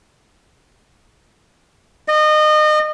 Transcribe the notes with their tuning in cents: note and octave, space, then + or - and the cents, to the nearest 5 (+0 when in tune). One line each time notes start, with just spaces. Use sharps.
D#5 -30